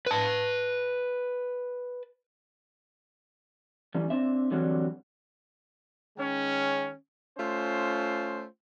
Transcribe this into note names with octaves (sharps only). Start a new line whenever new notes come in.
B4 A5
E3 G3 A3 C#4
C4 D4 E5
D3 E3 F#3 G3 C4
D#3 G#3 C#4
A3 C#4 F4 C5